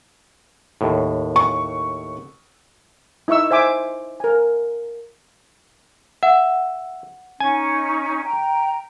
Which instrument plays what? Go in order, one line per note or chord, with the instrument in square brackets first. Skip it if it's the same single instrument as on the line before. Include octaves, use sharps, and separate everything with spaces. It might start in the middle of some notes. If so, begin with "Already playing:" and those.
[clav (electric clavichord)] D#2 A2
[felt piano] C#6
[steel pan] D#4 E4 E5 C#6 E6
C5 E5 G#5 D6
A#4 G#5
[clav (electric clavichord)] E5 [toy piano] F#5
[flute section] C#4 D#4 [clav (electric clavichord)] G#5
[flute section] G5 A#5